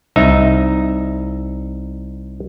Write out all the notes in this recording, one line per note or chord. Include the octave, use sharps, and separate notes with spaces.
C2 D#4 E5 A#5